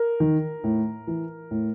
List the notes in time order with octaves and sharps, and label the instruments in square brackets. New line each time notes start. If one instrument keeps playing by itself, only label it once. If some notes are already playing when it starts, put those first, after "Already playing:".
Already playing: [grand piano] A#4
D#3
A2
E3
A2